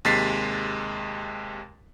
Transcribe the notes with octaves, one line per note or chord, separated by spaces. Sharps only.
D#2 C3 G#3 A6 B6 C7